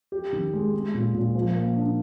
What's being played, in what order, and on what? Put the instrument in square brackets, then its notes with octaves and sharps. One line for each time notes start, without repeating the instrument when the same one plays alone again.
[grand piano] G4
D#3
G#3
G#3
A#2
A#2
F3
A#3
D4